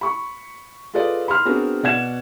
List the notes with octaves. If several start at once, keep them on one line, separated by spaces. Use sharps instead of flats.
B5 C#6
F4 G#4 A4 B4 D5 D#5
B5 C6 F6
B3 C4 D4 F#4 G#4 A#4
B2 D5 F#5 G#6 E7